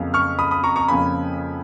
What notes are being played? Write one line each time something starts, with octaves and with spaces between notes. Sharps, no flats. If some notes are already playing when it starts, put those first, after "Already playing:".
Already playing: F2 C#3 F#3 A#3 C#4
C#6 F6
B5 D#6
B5 D#6
A#5 C#6
A#5 C#6
F2 C#3 F3 A#3 C#4 G#5 B5